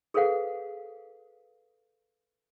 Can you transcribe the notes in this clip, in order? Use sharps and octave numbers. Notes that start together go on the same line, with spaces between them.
G#4 A4 B4 C5 F5 F#5